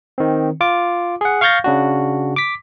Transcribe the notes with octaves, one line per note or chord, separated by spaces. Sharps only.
D#3 C4
F4 D6
G#4 F#5
F5 C#6 F6 G6 A6 A#6
C#3 D4 F#4
D6 B6